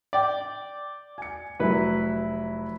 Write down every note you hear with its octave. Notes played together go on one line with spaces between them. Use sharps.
D5 G5
G#5 C#7
F1 F#3 E4 B4